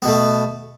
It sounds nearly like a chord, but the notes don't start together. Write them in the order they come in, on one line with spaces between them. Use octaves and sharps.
B3 B2 A3